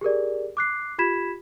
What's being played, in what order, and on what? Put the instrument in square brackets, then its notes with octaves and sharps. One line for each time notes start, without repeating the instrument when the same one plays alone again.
[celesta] G4 G#4 A#4 D5
D6 F#6 C7
F4 G4 B5 G#6 B6 E7